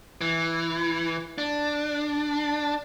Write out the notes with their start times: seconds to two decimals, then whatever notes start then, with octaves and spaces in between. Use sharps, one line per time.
0.21 E3
1.38 D4